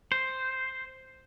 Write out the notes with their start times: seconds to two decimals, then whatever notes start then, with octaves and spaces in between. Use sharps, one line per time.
0.12 C5